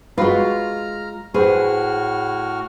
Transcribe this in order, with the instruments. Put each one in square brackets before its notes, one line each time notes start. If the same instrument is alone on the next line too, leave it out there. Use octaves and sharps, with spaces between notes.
[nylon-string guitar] G#3 F4 [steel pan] F#4 B4 [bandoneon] A#5 F6
[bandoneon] A2 F#4 F6 [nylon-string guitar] G#4 [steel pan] B4 C5